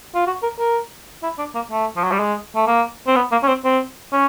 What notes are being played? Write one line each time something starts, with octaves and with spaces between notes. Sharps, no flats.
F4
F#4
A#4
A#4
E4
D4
A#3
A3
F3
F#3
G3
G#3
A3
A#3
C4
B3
A#3
C#4
C4
C4
C#4